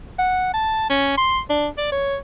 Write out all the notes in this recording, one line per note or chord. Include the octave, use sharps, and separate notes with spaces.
F#5
A5
C#4
C6
D4
D5
C#5